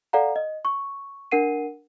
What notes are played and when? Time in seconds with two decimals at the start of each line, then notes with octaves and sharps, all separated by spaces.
0.13 A4 D5 F5 F#5 A#5
0.36 D#5
0.65 C#6
1.32 D4 A#4 F#5 C7 D#7